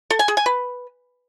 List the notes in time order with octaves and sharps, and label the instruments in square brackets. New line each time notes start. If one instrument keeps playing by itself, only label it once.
[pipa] A4
G#5
G#4
G#5
B4